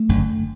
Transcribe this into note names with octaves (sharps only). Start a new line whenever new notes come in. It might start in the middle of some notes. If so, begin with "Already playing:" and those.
Already playing: A3
F#1 F#2 D3